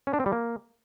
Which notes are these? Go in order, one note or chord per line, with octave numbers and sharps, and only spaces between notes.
C#4
D4
C4
G3
A#3